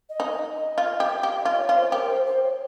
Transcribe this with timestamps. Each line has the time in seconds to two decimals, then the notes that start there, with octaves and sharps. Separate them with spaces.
0.09 D#5
0.20 D#4
0.31 D#5
0.54 D#5
0.78 F4
1.00 G4
1.23 G4 F5
1.40 D#5
1.45 F4
1.57 C#5
1.69 F4
1.75 C5
1.92 G4 A#4
2.09 C5
2.26 C5
2.44 C#5